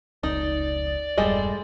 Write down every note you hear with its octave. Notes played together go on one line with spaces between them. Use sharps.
F1 C#2 D#4 D5
E1 G2 G3 G#3 A4 D#5